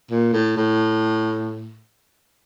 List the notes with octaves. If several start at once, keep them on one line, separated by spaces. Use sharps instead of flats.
A#2
A2
A2